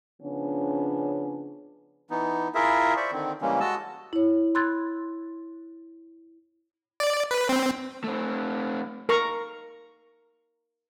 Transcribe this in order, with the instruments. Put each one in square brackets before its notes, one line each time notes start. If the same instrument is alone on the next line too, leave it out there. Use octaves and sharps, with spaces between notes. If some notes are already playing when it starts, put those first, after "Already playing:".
[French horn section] C#3 F3 B3 C#4 D4
[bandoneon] E3 B3 D#4
E4 F4 G#4 A#4 E5
C5 D5 E5 C#6
D3 D#3 C4
C#3 E3 G3 G#3 A#3 C#4
G#3 F#4 D#5 A5 E6
[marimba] E4 C#5
B5 C6 E6 F#6 G#6 A6
[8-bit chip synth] D5
B4
C4
[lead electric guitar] A3 C4
[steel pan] A#4 A#5 C#6